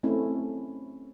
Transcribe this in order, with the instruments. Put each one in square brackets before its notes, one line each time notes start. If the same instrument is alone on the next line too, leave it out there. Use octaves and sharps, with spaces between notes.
[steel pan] A3 C4 C#4 E4